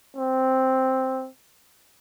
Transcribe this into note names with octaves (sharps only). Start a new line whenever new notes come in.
C4